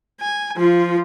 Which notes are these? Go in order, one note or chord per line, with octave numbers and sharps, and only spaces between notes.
G#5
F3 F4